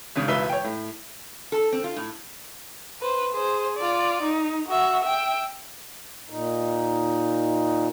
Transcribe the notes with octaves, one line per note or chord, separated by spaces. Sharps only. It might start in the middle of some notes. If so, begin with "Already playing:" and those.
G#1 C#3
E1 C#2 B4 E5 B6 G7
C#5 G5
A2
A4
C4
F4
A2
B4 C5
G#4 C5
F4 D5
D#4
F#4 E5
E5 G5
A#2 D#4